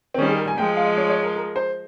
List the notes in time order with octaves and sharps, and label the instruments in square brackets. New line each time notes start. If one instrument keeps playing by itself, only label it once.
[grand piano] C4
[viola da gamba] D#3 G3 [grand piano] C#4
[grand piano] G#4
A#4
G#5
[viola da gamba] F3 G#3 [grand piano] G5
[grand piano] F5
D#5
C#5
C#5
A#4
A#4
C5